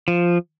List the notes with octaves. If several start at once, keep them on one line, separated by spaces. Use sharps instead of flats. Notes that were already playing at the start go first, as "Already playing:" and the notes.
F3